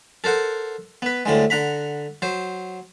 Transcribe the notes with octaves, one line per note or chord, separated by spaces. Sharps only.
A4 A#4 C5 F#5
B3 B4
D2 A2 D3 G3 G#3
D3 F#5 A#5 B5
F#3 C5